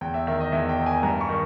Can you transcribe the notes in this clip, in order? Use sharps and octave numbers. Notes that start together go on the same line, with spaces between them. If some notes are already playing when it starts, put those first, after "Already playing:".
E2 G5
E5
D#3 E5
D#5
E2 E5
G5
D#3
G#5
G2 A#5
C#6
D#3